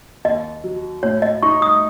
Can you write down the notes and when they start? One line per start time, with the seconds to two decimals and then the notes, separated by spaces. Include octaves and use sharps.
0.25 D#2 D#5
0.64 F#3
1.03 A2 C#5
1.22 D#5
1.43 D#4 C#6
1.62 D#6